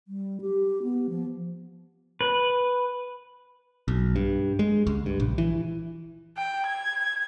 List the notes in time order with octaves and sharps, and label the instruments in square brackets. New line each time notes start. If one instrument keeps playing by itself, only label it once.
[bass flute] G3
G4
B3
F3
[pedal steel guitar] B4
[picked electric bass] B1
G2
G#3
C#2
G2
A#1
E3
[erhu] G5
G#6